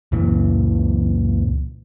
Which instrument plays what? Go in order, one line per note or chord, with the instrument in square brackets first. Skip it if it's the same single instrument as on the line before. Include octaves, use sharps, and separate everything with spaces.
[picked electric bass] C#2 F#2 A#2 E3